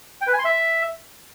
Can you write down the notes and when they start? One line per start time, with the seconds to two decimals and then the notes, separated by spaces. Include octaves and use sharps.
0.21 G5
0.27 B4
0.33 G#5
0.39 C6
0.45 E5